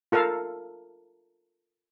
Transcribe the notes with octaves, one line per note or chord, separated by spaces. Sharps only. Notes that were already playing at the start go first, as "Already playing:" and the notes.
F4 A4 A#4 F5